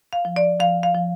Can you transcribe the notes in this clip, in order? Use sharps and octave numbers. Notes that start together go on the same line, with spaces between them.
F5
F3
D5
F3 F5
F5
F3